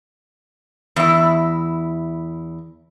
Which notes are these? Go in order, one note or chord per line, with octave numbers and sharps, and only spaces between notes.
E2 E4